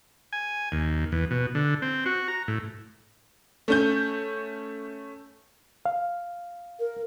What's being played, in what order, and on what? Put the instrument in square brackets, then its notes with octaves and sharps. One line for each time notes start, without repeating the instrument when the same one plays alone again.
[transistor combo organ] G#5
D#2
E2
B2
D3
C4
F#4
A#5
A2
[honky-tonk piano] A3 C#4 G6
[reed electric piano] F5
[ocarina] A#4